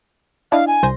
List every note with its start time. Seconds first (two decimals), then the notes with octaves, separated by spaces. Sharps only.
0.52 D4 E4 D#5 F5
0.67 G#5
0.83 C2 C5 A#6